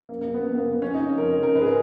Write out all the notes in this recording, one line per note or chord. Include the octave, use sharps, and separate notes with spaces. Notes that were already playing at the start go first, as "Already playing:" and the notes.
F#2 A#3
A#3
C#3
B3
F#2 A#3
B3
A#3
C#3
B3
F2 C#4
D#4
C#3
F2 A#4
C#3
A#4
G#2 B4
G#4
A#4